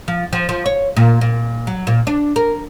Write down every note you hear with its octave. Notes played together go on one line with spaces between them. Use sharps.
F3
F3
F3
C#5
A#2
A#2
F#3
A#2
D4
A#4